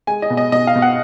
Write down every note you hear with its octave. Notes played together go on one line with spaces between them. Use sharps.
G#3 G#5
D#5
B2
D#5
B2 D#5
F5
B2
F#5